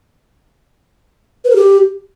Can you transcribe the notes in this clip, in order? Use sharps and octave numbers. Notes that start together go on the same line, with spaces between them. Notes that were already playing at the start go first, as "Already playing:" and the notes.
B4
A#4
G4